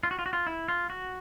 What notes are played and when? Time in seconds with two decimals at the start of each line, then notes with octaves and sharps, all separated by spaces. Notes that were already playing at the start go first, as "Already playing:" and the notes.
0.03 F4
0.11 F#4
0.19 F4
0.26 F#4
0.33 F4
0.47 E4
0.68 F4
0.90 F#4